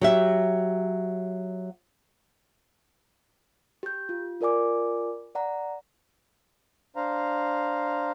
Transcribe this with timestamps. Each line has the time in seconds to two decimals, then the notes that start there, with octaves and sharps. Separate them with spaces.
0.01 F#3 G4 E5
3.83 G4 G6
4.09 F4
4.41 F4 A#4 D5 G#5 D6
5.35 D5 F#5 A#5
6.96 D4 C5 F5 A#5